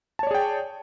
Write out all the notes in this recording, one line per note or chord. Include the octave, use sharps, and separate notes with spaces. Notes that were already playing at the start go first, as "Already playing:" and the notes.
G#4 C#5 D5 G5 A5